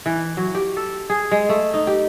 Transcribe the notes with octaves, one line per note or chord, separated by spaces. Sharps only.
E3
F#3
G4
A4
G#4
G#3
A3
D#4
G4